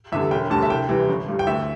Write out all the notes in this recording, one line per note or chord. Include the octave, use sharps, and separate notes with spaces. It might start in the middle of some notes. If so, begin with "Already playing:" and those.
E2 D3 G3 E5
E1 G5
D2 D3 G3 A5
E5
C2 G5
C3 E3 G3
G1
G2 G3
G5
D2 E5